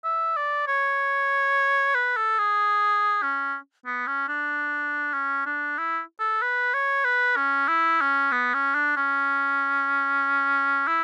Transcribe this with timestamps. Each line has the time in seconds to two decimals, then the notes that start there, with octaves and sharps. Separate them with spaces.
0.04 E5
0.36 D5
0.68 C#5
1.94 B4
2.17 A4
2.38 G#4
3.22 C#4
3.86 B3
4.07 C#4
4.28 D4
5.13 C#4
5.46 D4
5.78 E4
6.19 A4
6.42 B4
6.74 C#5
7.04 B4
7.36 C#4
7.68 E4
8.01 C#4
8.32 B3
8.54 C#4
8.75 D4
8.96 C#4
10.87 E4